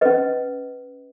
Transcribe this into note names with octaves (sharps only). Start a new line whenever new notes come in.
C#4 B4 D#5